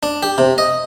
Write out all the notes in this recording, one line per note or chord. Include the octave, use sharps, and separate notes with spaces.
D4
G4
C3
D#5